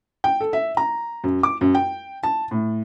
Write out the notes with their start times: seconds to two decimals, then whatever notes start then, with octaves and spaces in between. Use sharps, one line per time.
0.24 G5
0.40 A4
0.53 E5
0.77 A#5
1.24 F#2
1.43 D6
1.61 F#2
1.75 G5
2.23 A5
2.51 A2